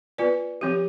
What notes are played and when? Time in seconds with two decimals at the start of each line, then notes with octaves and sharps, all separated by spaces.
0.18 B3 F4 B4 D5
0.61 F3 C4 G4